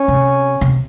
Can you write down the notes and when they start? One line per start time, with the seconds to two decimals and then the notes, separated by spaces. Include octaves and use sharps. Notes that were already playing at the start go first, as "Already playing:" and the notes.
Already playing: C#4
0.08 C3
0.61 C3